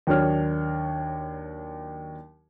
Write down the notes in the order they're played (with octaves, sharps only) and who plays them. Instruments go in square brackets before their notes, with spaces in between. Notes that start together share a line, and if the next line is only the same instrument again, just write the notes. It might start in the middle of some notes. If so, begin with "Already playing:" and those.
[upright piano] D#2 F#3 D4 C#5 F6